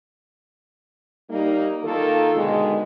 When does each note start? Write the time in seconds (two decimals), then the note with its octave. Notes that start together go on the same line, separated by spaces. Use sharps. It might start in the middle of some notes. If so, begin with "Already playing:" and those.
1.30 G3 A#3 D#4
1.84 D#3 A#3 F4 A4
2.35 B2 D3 D#3 G#3